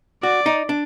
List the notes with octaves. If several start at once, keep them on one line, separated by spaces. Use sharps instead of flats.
F#4 D5
D#4
D4